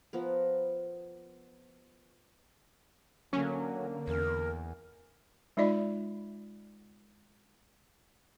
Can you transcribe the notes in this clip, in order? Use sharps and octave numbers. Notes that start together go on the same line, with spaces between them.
F3 B3 A#4
D3 F#3 A#3 C#4
E2 A#4
G#3 D#4 F4 D5 D#5 B5